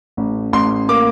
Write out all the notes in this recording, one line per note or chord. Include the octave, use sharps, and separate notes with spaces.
A1
A1 C6
A#3 D6